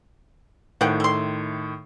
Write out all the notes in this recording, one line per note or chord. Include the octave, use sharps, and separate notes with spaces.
A2 D#3 F3 F#5 G5
A3 C6